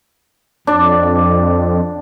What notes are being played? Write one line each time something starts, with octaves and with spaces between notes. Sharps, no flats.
F2 D4 D5